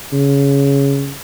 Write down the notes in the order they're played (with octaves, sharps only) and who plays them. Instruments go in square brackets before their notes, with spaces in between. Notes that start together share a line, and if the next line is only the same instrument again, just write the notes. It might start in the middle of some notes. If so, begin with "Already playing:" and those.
[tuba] C#3